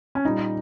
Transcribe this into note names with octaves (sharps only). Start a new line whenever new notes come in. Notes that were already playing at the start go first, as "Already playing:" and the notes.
C#4
A#2 G3 D#4